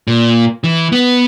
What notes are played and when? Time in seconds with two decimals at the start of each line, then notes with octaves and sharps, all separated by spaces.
0.08 A#2
0.64 E3
0.92 B3